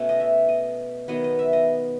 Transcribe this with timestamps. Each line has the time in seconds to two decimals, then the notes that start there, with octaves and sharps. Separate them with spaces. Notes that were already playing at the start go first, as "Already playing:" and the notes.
Already playing: B2 A3 C#4
0.09 D#5
0.20 E5
0.49 D#5
1.08 D#3 F#3 B3 D#5
1.24 D#5
1.39 E5
1.53 D#5